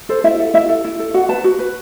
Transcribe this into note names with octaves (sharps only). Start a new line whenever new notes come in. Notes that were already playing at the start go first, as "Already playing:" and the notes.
A4 C5
E4 E5
A4
E4 E5
A4
E4
A4
F#4 F#5
B4 A5
F#4
B4